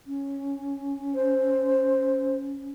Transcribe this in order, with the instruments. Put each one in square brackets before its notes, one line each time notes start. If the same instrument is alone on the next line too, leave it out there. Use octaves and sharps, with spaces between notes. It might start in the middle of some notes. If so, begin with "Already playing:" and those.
[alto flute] C#4
[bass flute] C5